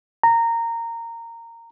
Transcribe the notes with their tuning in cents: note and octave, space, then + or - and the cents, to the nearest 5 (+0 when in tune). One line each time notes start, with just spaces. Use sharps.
A#5 -15